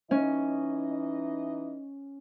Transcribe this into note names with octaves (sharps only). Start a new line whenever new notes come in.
E3 C#4 D#4 D#5